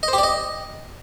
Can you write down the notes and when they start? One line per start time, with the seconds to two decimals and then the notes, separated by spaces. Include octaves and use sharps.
0.03 D#5
0.08 C5
0.13 G4
0.18 D5
0.23 D#5